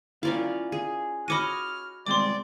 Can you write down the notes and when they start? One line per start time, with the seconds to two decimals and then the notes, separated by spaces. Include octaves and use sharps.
0.23 C#4 E4 F4 A#4 D5 F5
0.72 G#4
1.28 F#4 C#5 D#5 B5 D6 F6 D#7
2.06 C2 G#3 C4 D5 C6 D6